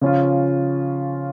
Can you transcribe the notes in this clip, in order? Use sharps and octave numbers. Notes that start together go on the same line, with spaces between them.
C#3 F3 C#4 F4